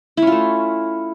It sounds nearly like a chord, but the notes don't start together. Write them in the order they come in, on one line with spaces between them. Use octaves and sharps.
E4 C#4 F4 A3